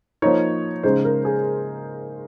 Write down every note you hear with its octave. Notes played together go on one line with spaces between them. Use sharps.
F3 A#3 D#4 C#5
C#3 G#3 D#4 C5
A#4
G#4